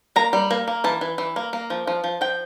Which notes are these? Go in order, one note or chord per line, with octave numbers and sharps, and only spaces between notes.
A#3 A#5
G3
A#3
A#3
E3 A5
E3
E3
A#3
A#3
F3
F3
F3
F3 G5